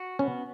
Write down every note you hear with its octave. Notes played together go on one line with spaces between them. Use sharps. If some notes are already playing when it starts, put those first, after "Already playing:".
Already playing: F#4
B3 C#4